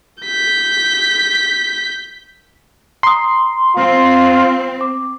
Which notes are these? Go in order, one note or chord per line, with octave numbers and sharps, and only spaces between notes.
G6 B6
A#5 C6 D#6
C4 F4
D6